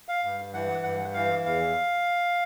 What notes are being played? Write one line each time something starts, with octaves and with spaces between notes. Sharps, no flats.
F5
G2
E3 F#5
G2 F#5
E3 F5
E2 F5